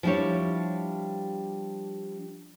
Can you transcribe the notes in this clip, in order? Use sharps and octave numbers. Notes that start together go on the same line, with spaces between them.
F3 G3 D4 E4 G4 C#5